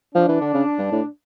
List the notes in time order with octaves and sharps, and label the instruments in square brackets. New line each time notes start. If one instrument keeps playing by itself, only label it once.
[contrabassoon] F3 [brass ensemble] D4
[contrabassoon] E3
D3
C#3
G2
A2